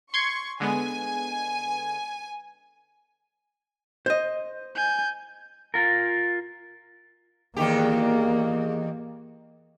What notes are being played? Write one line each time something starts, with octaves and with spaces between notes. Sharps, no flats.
C6 C#6 G#6 C#7
D3 G#3 B3 G#5
C5 D#5
G#5 G6
F4 A#4
E2 D#3 A#3 G4